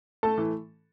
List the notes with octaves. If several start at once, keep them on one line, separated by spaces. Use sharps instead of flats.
A3 A4 A5
E3